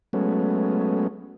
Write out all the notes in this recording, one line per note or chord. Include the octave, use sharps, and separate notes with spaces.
F#3 G#3 A3 B3 C#4